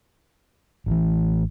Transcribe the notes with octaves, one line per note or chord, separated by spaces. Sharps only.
A1 E3